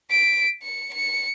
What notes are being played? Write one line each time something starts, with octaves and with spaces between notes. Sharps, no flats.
B6 D7
C#7
C#7